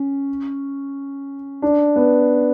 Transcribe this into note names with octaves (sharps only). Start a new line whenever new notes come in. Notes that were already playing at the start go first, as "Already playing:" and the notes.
Already playing: C#4
D4
B3